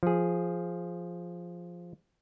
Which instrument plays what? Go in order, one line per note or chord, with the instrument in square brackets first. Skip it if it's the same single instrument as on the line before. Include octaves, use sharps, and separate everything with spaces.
[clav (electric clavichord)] F3 G#4